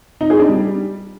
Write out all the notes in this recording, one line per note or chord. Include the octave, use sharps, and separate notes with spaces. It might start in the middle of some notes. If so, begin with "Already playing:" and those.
D#4
G#4
D4
G3